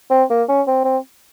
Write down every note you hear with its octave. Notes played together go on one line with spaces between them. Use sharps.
C4
A#3
C#4
C4
C4